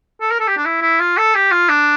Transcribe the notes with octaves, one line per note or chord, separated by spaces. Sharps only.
A4
A#4
A4
G4
D4
E4
E4
F4
A4
G4
F4
D4